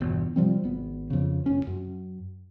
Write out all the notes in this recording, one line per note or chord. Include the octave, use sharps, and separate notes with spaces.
G1 E2 B2
C3 F3 G3 C4
G#1 B3
F2 C#3
F1 C#4
F#2